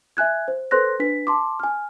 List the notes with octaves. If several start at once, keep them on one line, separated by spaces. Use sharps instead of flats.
E5 G#5 F#6 G#6
C5
A4 B4 C5 C6 F#6 A#6
D4 B4 B6
A5 C6 D6
G#5 F6